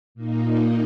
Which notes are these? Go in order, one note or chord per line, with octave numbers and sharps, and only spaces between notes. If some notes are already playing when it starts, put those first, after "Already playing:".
A#2 A#3 D#4